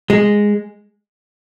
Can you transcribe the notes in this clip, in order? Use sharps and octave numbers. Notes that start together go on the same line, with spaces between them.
G#3